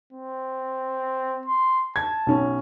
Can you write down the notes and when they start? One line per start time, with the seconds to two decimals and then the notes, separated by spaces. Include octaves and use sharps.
0.13 C4
1.46 C6
1.96 A5 G#6
2.27 B1 C#4